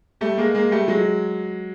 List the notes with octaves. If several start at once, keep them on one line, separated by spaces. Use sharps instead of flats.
G3 A3
G#3 A#3
G#3 A#3
G3 A3
F#3 G#3